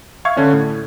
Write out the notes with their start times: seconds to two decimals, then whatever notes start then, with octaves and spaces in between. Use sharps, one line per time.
0.25 E5 F5 C#6 G#6
0.37 D3 C#4 D4
0.53 A2